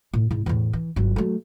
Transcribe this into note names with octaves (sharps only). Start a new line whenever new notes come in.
A2
G#2 E4
E2 A2
E3
G1 F#3
F#3 A3